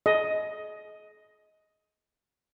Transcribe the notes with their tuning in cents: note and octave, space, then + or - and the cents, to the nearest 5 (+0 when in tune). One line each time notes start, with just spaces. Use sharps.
G#4 +40 D#5 +10